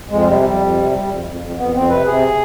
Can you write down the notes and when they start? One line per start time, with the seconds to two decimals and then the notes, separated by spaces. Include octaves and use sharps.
0.10 F2 G#3
0.26 C3 G3
0.42 F2 G3
0.59 F2
0.75 C3
0.91 G3
1.08 F2
1.24 F2
1.40 F2
1.56 F2 B3
1.73 F2 C4
1.89 C3 B4
2.05 C3 G#4